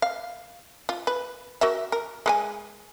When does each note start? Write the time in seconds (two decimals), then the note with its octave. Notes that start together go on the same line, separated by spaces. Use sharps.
0.02 F5
0.89 F4
1.07 B4
1.61 F#4 A#4 E5
1.92 A#4
2.26 G#3 A#4 G#5